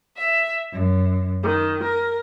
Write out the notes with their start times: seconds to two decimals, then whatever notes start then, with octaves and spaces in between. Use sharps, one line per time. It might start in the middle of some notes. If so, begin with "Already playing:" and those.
0.17 E5
0.73 F#2
1.42 D#3
1.82 A#4